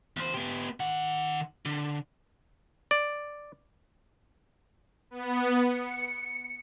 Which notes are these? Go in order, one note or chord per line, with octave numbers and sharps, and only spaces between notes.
E2 C5
B3 G4
D#3 F#5
D3
D5
B3
C#7